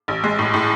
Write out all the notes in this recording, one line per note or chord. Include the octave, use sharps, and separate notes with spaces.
A1
G#3
A2
A2